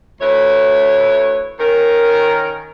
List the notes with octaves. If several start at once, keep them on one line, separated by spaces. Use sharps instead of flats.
D2 E4 B4 C#5
D#3 C#4 A#4